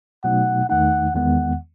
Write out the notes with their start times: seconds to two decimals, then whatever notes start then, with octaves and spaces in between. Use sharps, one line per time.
0.24 B2 F#3 A3 D#4 F#5
0.69 E2 D#3 A3 D#4 F#5
1.15 E2 D#3 G#3 B3 F#5